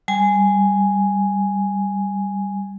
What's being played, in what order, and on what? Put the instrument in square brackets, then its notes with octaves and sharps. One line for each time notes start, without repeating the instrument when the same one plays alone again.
[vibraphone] G3 G#5